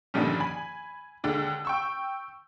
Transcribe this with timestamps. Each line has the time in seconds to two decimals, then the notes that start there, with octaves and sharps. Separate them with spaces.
0.14 G2 A#2 D3 D#3 F3 C#4
0.40 G#5 B5
1.24 D#2 D3 G#3
1.65 G5 C#6 E6